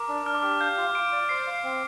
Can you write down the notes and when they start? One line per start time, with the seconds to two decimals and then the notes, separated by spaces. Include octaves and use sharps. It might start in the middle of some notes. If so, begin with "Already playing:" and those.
Already playing: A#4 D6
0.08 D4
0.26 D4 F6
0.34 D6
0.43 G4 F6
0.61 F5 G6
0.78 F4
0.94 F4 D7
1.12 D5
1.29 C5 C7
1.47 F5
1.64 C4